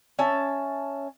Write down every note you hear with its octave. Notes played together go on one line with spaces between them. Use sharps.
C#4 E5 A5